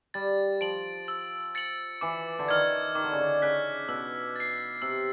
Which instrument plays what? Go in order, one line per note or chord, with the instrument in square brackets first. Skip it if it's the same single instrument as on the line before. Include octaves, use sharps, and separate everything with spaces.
[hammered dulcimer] G3 [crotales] A6
[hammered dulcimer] F3 [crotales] D7 F#7
[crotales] E6
A6 C#7 F#7
[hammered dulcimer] E3 [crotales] D6
[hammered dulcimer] D3
[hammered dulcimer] D#3 [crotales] F6 G#6
[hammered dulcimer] D#3 [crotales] D6
[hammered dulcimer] D3
C#3
D3
[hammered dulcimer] C#3 [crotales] F#6 B6
[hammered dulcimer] B2 [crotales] E6
[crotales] A6 C7
[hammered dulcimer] C3 [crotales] E6